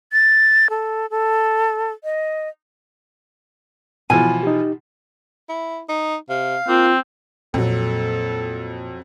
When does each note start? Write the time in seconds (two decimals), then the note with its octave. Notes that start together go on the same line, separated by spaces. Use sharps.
0.12 A6
0.70 A4
1.10 A4
2.04 D#5
4.10 B2 E3 F3 G#5
4.43 D#4 G4
5.49 E4
5.89 D#4
6.30 C3 F5
6.68 A#3 C4 F4
7.54 F2 A#2 F#3 A4